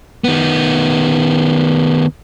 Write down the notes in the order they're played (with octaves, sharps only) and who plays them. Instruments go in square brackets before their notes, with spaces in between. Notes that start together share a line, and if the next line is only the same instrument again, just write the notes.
[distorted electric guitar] D#3 B3